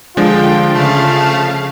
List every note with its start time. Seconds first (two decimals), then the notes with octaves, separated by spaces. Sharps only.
0.17 D3 F3 G#3 D4 F4 G5
0.74 C#3 A3 F5